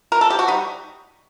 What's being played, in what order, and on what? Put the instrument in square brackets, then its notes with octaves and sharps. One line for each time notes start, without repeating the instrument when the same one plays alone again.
[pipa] A#4
A4
G4
F#4
G3 D#4